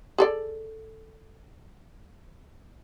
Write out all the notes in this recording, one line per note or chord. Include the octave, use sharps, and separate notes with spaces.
G#4 A4 D5